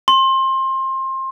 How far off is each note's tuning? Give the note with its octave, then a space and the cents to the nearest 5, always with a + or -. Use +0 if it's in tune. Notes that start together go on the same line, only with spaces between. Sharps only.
C6 +25